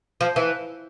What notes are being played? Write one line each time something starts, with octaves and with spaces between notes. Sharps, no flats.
F3
E3